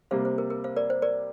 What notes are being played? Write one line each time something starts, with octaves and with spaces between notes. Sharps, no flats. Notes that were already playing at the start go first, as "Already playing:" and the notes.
C3 G3 A#3 C5 F5
C5
A#4
A#4
C5 F5
A#4 D5
C5
A#4 D5